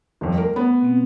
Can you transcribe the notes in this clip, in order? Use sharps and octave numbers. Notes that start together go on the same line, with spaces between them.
D#1 F2
A3 A#4
B3 B5
B2 A#3 C4